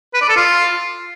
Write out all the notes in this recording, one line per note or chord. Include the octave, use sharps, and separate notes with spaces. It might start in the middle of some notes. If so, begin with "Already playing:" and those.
B4
D5
A4
F4